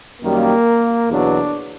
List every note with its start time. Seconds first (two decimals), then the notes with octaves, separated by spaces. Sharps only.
0.22 F#2 D#3 G3 A#3
1.09 E2 B2 F#3 D4